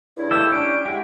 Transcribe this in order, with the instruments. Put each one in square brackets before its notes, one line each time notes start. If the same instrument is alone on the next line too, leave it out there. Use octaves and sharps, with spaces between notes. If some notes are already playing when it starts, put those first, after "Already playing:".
[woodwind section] C#2 G2 [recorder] E4
[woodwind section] D#2 E6 [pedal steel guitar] A3 G4 A4 [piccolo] E7
[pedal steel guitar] C#4 G4 [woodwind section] D4 [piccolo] D7
[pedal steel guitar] G#3 E4 [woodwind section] F#4 G4